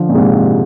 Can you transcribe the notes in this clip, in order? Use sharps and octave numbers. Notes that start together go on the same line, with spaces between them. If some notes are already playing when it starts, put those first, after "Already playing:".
Already playing: D3 F3
A#2
G#2 C3